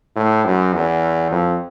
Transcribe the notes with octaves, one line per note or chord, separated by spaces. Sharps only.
A2
F#2
E2
F2